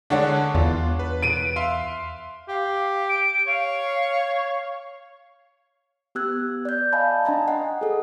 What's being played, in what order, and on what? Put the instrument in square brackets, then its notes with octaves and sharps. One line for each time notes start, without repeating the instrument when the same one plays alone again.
[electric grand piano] D3 G#3 [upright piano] D4 C#5 F#5
[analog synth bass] E2 [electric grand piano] F4
[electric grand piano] B4
[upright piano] D7 D#7
[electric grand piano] E5 F5 C6
[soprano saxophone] G4 [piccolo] F5
[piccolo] D7
[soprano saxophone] C#5 [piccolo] F5
[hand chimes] B3 G4 E6 F#6 G#6
D5 G6
D5 D#5 F5 G#5 A5 B5
D4 D#5 G#5 A#5 C6
D#5 F#5 G5
G#4 A4